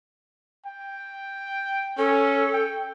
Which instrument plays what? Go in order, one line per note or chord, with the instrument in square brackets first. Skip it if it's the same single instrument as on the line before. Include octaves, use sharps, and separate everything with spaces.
[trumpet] G5
[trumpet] C#4 [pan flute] A4
[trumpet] G5